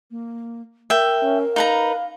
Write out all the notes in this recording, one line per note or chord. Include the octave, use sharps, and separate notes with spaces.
A#3
A#4 E5 G5
C#4
D#4 B4 F5 A#5